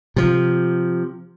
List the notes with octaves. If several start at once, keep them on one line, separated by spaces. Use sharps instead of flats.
C3 F3